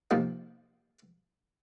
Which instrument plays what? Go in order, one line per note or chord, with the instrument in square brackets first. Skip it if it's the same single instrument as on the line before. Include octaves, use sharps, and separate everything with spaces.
[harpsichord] C3 F3 A#3 D#4